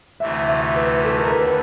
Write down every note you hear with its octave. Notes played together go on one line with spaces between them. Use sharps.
D2 C3 E3 A3 E5
E5
B4
A4
A#4
D#2 D3 B4